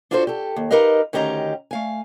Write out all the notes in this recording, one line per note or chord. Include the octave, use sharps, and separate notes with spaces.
D4 F4 F#4 A4 B4 C5
G4 A4
D#2
D#4 G4 A#4 B4 D#5 F5
D2 D#3 C#4 G4 D#5 A#5
A3 F5 G#5